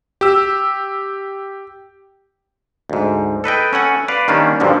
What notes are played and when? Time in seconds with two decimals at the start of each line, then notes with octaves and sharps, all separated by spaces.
0.21 G4 E6
2.90 D2 G#2
3.44 A4 B4 D#5 G5
3.73 C#4 A4 F#5 G#5
4.08 B4 D5 F5
4.28 D#3 G3 A#3 C#4 D4
4.60 G2 A#2 D3 F3 F#3